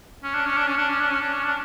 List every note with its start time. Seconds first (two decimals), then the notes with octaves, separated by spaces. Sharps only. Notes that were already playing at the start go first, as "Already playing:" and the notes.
0.23 C#4
0.34 D4
0.46 C#4
0.57 D4
0.67 C#4
0.78 D4
0.89 C#4
1.00 D4
1.10 C#4
1.21 D4
1.33 C#4
1.44 D4